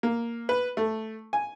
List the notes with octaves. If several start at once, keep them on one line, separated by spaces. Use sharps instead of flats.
A#3
B4
A3
G#5